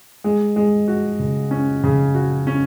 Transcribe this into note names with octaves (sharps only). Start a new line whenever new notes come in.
G#3
G#3
F#4
C#3
C#4
C#3
F#4
C#4